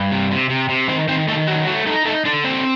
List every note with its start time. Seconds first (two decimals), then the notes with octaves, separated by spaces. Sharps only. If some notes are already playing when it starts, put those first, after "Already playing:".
Already playing: G2
0.11 C3
0.31 C3
0.50 C3
0.69 C3
0.89 D#3 C4 C5
1.08 D#3 C4 C5
1.28 D#3 A3 A4
1.47 F#3 F#4
1.67 A3 F#4
1.86 A3 D#4 A4
2.05 A3 D#4 A4
2.25 D3 D4 D5
2.44 C4 D4 C5